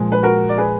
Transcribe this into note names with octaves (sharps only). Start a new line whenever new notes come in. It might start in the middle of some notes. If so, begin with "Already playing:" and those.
Already playing: A#2 F3 G#3
B4
F#4 A#4
D5
G#4 B4